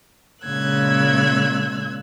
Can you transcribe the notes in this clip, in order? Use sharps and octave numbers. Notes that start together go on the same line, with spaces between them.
A#2 C#3 G#3 E6 F#6 G#6